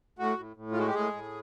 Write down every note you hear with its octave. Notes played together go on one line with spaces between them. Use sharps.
A2 F#4
A2
A2
F4
G#3 F#4
G4
A2 G#4
A2